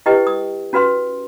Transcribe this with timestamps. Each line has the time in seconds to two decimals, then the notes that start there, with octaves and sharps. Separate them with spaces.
0.06 E4 G4 B4 D#5 G5
0.27 D#6
0.73 C#4 F#4 B4 F#5 C6